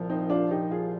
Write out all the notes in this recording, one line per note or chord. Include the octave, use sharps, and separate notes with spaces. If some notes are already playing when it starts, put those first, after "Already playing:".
Already playing: C2 A#2 F3
C4 D#4
D4 F4
D#4 G4
F4 G#4